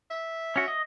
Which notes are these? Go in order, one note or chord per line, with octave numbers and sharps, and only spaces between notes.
E5
C#4 F#4
D#5